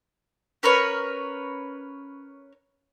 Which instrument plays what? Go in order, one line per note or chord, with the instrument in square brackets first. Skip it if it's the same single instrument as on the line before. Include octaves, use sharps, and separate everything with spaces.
[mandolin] C#4 A#4 B4 C#5